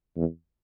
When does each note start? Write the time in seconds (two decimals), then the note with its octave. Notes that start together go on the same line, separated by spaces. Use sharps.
0.17 E2